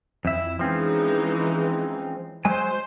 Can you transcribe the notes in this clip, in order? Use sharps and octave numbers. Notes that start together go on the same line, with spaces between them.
F2 E4 E5
E3 F3 G#3 C4 C#4 D#4
F#3 G#3 C5 G#5